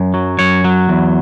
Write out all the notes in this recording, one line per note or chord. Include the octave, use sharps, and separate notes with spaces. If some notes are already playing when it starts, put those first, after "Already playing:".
Already playing: F#2
F#3
F#2 C#5
F#3
E2